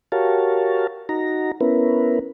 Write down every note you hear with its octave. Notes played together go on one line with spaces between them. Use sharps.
F#4 G4 A#4 C#5 F5 A5
D#4 F#4 A#5
B3 C#4 E4 A#4 B4